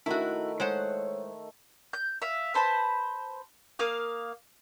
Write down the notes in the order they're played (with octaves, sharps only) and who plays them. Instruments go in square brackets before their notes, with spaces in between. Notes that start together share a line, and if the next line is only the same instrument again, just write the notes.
[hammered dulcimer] D#3 A3 [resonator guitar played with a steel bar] E4 F#4
[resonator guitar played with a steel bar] G#3 C5 F#5 [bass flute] C#5
[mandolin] G6
E5 F5
B4 C5 A5 B5
A#3 F5 D#6